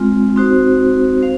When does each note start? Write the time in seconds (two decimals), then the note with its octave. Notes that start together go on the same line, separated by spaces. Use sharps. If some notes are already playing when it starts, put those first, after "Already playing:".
Already playing: G#3 C4 F4
0.36 C4 D#4 F#4 C5
1.22 C5 F5